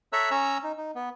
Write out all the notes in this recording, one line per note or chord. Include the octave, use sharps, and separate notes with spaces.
A4 C#5 E5 A#5 E6 F#6
C#4 C#5 A#5 E6
D#4
D#4
B3